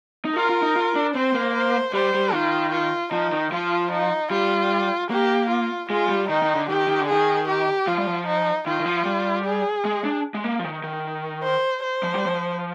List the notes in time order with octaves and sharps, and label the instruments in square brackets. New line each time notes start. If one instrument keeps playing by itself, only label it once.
[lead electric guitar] D#4
[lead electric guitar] F4 [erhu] A#4
[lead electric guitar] F4
D#4
F4
D4
[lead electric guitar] C4 [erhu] C5
[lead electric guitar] A#3
[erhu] C5
[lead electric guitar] G3 [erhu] C5
[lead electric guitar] G3
[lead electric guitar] D#3 [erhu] F4
[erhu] F4
[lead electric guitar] F3 [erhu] D#4
[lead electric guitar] D#3
[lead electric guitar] F3 [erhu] F4
[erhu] D#4
[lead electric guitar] G3 [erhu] F4
[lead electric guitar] A#3 [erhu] G4
[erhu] F4
[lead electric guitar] G#3 [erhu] F4
[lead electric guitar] G3
[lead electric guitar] D#3 [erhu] D#4
[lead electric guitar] D#3
D3
[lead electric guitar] D#3 [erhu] G4
[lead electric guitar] D#3
D3
[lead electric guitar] D#3 [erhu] G#4
[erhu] G4
[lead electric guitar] F3 [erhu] F4
[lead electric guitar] G3
F3
[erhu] D#4
[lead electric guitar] D#3 [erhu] F4
[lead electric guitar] D#3
F3
G3
[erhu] G#4
[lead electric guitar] G#3
D4
G#3
A#3
F3
D#3
D#3
[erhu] C5
C5
[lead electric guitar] F3
G3
F3